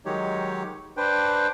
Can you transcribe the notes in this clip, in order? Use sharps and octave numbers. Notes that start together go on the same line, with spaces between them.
D#3 F#3 G#3 D#4 G4 C#5
D4 B4 C5 G5